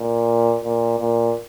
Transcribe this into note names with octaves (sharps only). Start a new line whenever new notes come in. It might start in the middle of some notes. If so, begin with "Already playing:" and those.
Already playing: A#2
A#2
A#2